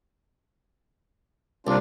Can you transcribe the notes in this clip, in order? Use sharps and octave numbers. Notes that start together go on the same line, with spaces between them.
C2 A#3 D4 F4